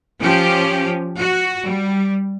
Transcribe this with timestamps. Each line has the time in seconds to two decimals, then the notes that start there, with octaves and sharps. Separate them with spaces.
0.20 F3 C#4 G4
1.19 F#4
1.64 G3